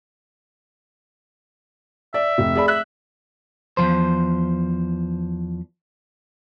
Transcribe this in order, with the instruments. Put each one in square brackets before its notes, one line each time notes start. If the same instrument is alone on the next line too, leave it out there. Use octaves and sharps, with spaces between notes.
[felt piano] D5 [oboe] E5
[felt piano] F1
G#4 D5 B5
[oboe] E5 [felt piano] F#6
[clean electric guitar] E2 C3 F3 C5